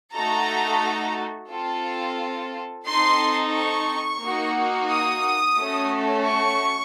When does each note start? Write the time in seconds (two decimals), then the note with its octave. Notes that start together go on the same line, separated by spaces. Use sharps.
0.14 A3 D#4 F#4 A4 A#5
1.51 C4 F4 A4
2.86 C4 D#4 A4 C6
3.53 C#6
4.22 A#3 D#4 F#4
4.90 D#6
5.59 A3 C#4 F#4 A4
6.26 C#6